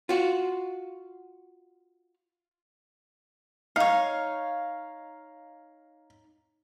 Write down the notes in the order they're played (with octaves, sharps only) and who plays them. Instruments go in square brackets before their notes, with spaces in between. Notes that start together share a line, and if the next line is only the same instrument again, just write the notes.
[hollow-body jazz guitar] F4 F#4
[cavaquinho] D#4 C#5 [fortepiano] F5